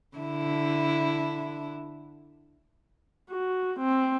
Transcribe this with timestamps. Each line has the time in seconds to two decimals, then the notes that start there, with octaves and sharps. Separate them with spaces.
0.17 D3 E4
3.30 F#4
3.80 C4